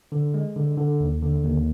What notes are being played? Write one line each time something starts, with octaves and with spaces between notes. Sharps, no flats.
D3
G#3
D3
D3
D#2
D3
D#2